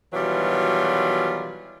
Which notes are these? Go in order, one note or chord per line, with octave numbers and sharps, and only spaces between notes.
B2 D#3 E3 F#3 G3 F4